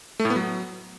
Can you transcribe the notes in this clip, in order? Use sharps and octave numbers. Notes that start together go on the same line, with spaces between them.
A3
A2
B3
F#3